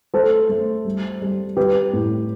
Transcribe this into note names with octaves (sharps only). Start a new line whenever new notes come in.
A3 A4 C5
A3
G3
G3
G3 G4 B4
A2